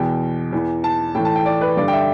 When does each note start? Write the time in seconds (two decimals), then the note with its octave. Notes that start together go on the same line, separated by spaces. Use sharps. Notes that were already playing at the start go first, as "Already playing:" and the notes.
Already playing: E2 B2 G5
0.53 E2 E3
0.84 A5
1.15 A2 G5
1.18 E3
1.25 A5
1.36 G5
1.46 D5
1.61 B4
1.77 G2 D3 D5
1.88 G5
1.93 E5